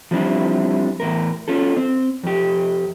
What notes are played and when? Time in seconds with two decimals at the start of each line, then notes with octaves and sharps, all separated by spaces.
0.11 F3 G3 C4 D4 E4
1.00 E2 A2 A#4
1.48 C#4 F4 A4
1.77 C4
2.24 F2 G4